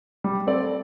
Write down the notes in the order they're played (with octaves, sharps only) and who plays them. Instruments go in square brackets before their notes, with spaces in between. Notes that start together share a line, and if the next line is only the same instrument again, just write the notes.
[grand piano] G3
C4 A4 D5